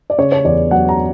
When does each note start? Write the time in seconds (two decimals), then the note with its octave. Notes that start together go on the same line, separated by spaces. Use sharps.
0.10 D5
0.18 C#3 C#5
0.32 C#5
0.45 E2 D5
0.71 F#3 F#5
0.89 A#5